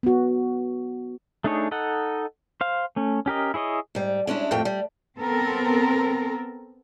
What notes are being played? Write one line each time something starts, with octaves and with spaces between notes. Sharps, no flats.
B3 F#4
A3 D4 D#4 G#4 C#5
D#4 A4 D#5 F#5
C5 F5
A3 C#4
C#4 G4 A#4 D#5
E4 G#4 C#5 D#5
G#2 G3
G#3 C#4 D4 E4
F2 A2 G3 A3 G5
G3
B3 C4 A4 A#4